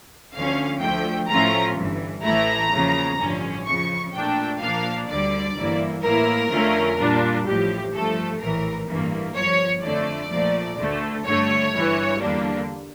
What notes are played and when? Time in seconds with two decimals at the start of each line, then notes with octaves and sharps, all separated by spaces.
0.34 D2 D3 F3 C#4 F5
0.81 D2 D3 F3 A3 G5
1.29 A2 F3 A3 C#4 F4 A#5
1.76 G1 G2 E3
2.24 A1 A2 E3 A3 E4 A#5
2.71 E2 C#3 F3 A#3
3.19 A1 G2 D3 F3 C#4
3.66 F2 C#3 F3 C#6
4.13 A#1 A#2 A3 D4 G5
4.61 A#2 F3 A#3 D4 F5
5.08 D2 D3 G3 D5
5.56 G1 G2 E3 A#3 E4
6.03 A2 E3 A#3 E4 A#4
6.51 F2 D3 A3 C#4 F4
6.98 A#2 G3 D4 F4
7.46 A1 A2 F3 G4
7.93 G2 F3 A3 A4
8.41 A#1 A2 E3 A#4
8.88 A1 G2 E3 A#3
9.36 G1 G2 F3 C#5
9.83 F2 D3 A3 D5
10.31 A#1 A#2 F3 A3
10.78 D2 D3 A3
11.25 G2 D3 A3 C#5
11.73 G1 G2 E3
12.20 E2 D3 G3 A#3 D4